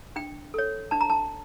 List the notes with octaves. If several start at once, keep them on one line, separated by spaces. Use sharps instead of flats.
D4 G5
A4 C#5
D4 A5
A#5
A5